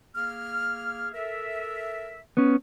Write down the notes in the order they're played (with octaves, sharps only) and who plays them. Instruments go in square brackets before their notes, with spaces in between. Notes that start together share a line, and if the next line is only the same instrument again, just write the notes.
[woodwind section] A#3 G#4 F6
A4 A#4 E5
[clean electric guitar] B3 C#4